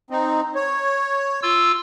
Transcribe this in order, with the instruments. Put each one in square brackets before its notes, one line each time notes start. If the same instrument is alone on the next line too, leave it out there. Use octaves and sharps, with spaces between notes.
[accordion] C4 D#4
C#5
[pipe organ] F4 E6